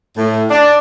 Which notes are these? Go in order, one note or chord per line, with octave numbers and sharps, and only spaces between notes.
A2
D4